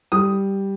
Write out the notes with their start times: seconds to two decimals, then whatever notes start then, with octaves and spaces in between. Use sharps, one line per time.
0.12 G3 D#6